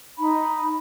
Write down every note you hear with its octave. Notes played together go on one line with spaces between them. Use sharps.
D#4 B5